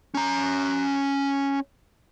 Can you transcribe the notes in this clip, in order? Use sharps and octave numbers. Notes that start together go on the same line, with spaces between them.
C#4 A#5